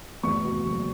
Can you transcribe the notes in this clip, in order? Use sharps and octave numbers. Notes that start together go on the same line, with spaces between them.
E2 C#6
B2
F#1